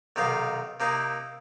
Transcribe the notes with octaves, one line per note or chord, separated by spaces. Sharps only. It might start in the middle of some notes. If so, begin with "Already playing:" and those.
B1 C3 D#3 D#4 F5
C3 A#3 D#4 E4